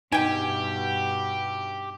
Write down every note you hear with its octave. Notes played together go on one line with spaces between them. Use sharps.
G2 B2 D#4 G4 G5 G#5